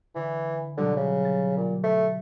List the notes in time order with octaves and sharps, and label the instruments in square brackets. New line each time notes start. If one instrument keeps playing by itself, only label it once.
[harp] D3 [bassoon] E3
[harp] B2 F#3 G3 [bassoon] D3
[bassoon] C#3
[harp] A6
[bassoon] A#2
A3